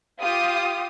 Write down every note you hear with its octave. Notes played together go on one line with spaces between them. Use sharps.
F4 G4 D#6